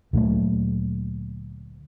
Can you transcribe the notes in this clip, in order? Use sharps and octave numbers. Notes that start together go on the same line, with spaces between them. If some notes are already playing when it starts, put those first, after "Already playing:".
D2 A#2 F#3 A3